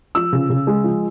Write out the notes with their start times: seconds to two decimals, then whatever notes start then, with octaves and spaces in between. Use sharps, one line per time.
0.15 F3 E6
0.33 C#3
0.50 C#3
0.67 G#3
0.84 F3